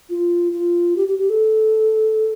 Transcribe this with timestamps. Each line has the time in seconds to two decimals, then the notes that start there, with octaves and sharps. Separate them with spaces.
0.10 F4
0.53 F4
0.96 G4
1.08 G4
1.18 G4
1.30 A4